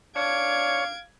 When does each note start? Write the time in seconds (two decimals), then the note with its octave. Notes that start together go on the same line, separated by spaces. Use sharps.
0.16 D4 C#5 F5 G#6 D7